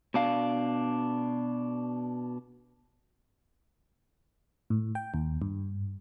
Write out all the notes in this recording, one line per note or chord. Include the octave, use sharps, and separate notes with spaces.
B2 D4 F5
A2
G5
D#2
G2